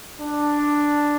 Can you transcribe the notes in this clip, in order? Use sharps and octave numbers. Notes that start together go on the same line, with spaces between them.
D4